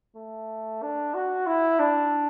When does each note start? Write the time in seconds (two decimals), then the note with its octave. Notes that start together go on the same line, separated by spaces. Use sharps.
0.16 A3
0.82 D4
1.14 F#4
1.47 E4
1.79 D4